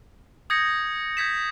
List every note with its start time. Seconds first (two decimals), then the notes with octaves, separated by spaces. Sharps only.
0.50 D#6 G6 G#6 A#6 C#7
1.17 G6 G#6 B6 E7